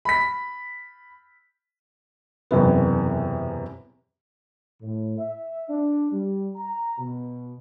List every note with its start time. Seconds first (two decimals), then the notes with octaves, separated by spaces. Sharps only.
0.05 B5 B6
2.51 E1 F#2 C3 B3
4.81 A2
5.18 E5
5.68 D4
6.12 G3
6.56 A#5
6.98 B2